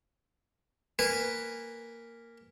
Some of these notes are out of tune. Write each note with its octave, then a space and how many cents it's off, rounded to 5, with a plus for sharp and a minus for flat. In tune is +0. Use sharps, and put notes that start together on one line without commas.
A#3 -10 B4 +0 G#5 -15